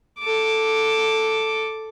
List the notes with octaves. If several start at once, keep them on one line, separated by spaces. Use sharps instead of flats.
A4 D6